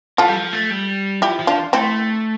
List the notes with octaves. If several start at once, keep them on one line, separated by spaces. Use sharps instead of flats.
E3 F4 A4
G3
F3
A3
G3
F3 E4 G4
F3
D4 F4
A3 C4 E4